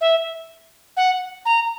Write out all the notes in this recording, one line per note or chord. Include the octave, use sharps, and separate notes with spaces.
E5
F#5
A#5